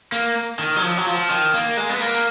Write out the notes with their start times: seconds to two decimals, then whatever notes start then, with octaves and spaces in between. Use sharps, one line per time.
0.12 A#3
0.59 D#3
0.76 F#3
0.83 F3
0.97 F#3
1.07 F3
1.30 D#3
1.54 A#3
1.77 G#3
1.90 B3
2.00 A#3